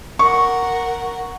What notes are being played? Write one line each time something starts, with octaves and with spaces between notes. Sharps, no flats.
A#4 F#5 C#6